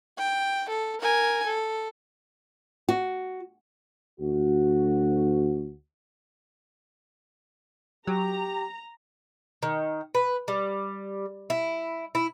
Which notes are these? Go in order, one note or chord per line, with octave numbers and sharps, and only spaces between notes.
G5
A4
A#4 G#5
A4
F#4
D2 F#4
F#3 G4 A#5
D#3
B4
G3
E4
E4